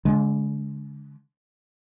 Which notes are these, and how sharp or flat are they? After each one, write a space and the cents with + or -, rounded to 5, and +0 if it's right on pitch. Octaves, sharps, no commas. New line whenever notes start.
D3 -35 G#3 +15